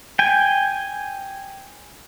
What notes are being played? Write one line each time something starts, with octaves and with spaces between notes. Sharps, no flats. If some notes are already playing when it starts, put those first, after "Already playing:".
G5 G#5